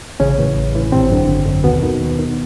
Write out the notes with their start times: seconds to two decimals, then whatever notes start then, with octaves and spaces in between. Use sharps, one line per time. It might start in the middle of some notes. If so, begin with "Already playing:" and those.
0.20 A1 C#3 C#4
0.38 A2 E3
0.57 A1
0.75 A2 E3
0.92 G#1 C3 C4
1.10 F#2 D3
1.28 G#1
1.46 F#2 D3
1.64 D#2 B2 B3
1.82 D#3
2.01 D#2
2.19 D#3